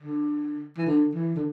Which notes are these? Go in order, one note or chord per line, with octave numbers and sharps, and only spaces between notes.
D3
E3
D3
E3
D3